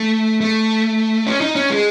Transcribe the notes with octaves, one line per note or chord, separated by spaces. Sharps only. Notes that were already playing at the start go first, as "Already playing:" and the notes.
Already playing: A3
A3
C#4
D#4
C#4
G#3